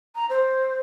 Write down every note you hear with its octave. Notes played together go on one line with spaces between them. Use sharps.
A#5
C5